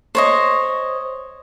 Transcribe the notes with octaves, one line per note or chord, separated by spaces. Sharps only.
C5 C#5 D#5